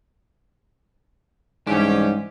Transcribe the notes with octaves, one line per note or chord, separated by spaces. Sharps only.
C2 G#2 E3 C#4 D4 G4